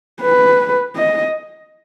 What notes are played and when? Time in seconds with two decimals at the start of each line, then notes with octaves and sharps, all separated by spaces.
0.22 B4
0.96 D#5